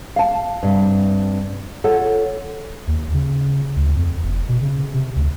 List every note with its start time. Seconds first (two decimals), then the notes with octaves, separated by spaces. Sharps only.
0.16 F5 A5
0.63 G2 C3
1.84 F4 A4 C#5 F#5
2.87 D#2
3.14 C#3
3.76 D2
3.96 F2
4.24 F#1
4.48 B2
4.61 C#3
4.93 C3
5.16 D2